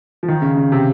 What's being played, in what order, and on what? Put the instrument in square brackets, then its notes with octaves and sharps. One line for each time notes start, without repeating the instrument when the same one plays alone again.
[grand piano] F3
D#3
C#3
C#3
C3